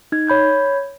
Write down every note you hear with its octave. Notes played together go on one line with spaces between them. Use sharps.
D#4 G#6
C#5 B5 G6 G#6